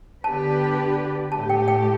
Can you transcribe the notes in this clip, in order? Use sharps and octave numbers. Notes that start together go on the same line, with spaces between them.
D3 B3 D4 G4 B4 A5
A2 A3 G4 A5
G5
G5